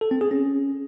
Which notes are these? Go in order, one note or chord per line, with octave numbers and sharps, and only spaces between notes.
A4
C4
G#4
C#4